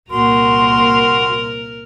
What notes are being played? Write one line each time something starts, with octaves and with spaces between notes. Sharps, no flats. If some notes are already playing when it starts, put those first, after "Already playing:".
C2 A#2 A#3 F#4 A#4 C6